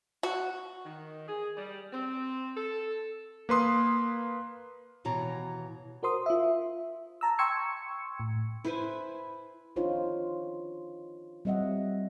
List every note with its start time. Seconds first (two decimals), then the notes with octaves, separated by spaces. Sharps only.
0.23 F#4
0.85 D#3
1.28 G#4
1.57 G3
1.93 C4
2.57 A4
3.49 A#3 B4 C6 D#6
5.05 D#2 B2 E3 C#5 A#5
6.03 F#4 A#4 C5 C6 D#6
6.26 F4 E5
7.21 A5 A#5 E6
7.39 G5 C6 C#6 E6 G#6 C#7
8.20 A2
8.64 E4 B4 C5 G#5
9.76 D4 D#4 F4 C5 C#5
11.45 G3 C4 D#5 E5 F#5